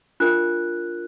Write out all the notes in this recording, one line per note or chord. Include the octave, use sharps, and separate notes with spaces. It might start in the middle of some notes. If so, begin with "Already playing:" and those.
D4 F4 A#4 F#6